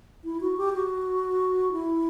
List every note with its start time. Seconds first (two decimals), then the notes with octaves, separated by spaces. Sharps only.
0.24 E4
0.41 F#4
0.57 G4
0.73 F#4
1.72 E4